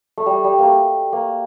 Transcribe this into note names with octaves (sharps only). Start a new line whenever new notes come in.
A3
G3
G3
A#3
A3
A#3